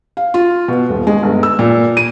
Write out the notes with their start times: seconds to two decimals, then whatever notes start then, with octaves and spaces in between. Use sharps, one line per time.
0.17 F5
0.34 F4
0.68 B2
0.89 D#1
1.07 G#3
1.23 G1
1.43 E6
1.59 A#2
1.97 D#7